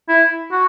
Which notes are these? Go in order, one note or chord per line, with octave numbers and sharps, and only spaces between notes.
E4
F#4